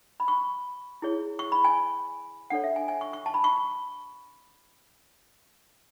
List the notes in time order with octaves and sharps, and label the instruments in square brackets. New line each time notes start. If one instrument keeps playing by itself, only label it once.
[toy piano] B5
C#6
E4 G#4 C#5
C#6
B5
G#5
D4 A4 C#5 F#5
E5
G#5
G#5
C#6
C#6
A5
B5
C#6